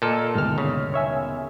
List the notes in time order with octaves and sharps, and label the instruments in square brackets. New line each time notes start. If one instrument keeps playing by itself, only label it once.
[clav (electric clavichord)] A#2 A4 [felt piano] D#5 E6 F6
[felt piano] G1 D#2 B2 [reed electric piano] G#2 F6
[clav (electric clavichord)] C#3
[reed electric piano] C#5 E5 G#5